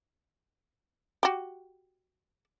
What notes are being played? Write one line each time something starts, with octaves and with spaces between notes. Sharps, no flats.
F#4 G4